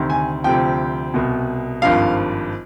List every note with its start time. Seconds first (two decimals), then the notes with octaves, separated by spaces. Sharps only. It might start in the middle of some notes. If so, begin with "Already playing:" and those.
Already playing: D2 C3 D#3
0.10 G#5
0.44 D2 C3 F3 G5
1.14 C2 B2
1.82 G#1 G2 F3 F5